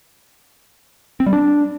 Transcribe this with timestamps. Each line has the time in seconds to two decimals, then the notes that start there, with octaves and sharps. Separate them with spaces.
1.20 C4
1.26 G3
1.33 D4